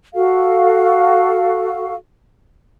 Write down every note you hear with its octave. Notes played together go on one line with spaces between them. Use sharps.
F#4 A4 F5